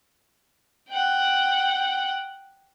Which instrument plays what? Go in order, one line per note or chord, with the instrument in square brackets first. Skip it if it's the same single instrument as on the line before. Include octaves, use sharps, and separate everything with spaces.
[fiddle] F#5 G5